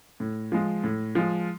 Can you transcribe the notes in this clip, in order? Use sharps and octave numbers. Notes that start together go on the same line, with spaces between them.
A2
F3 G#3
A2
F3 G#3